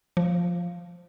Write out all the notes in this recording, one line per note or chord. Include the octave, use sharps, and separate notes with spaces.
F3